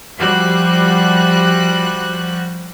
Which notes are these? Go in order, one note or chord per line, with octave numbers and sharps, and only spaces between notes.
F3 G3 F#4 F#6